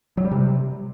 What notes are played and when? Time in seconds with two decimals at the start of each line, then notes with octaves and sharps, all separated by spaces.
0.17 F#3
0.24 G3
0.31 C3